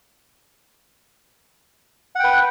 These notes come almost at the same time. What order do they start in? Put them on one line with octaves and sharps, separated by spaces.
F#5 G5 B4